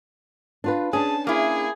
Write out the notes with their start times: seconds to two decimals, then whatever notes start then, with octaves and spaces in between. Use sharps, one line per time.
0.64 D4 F4 B4
0.93 C#4 D4 G#4 A5
1.27 A#3 E4 G#4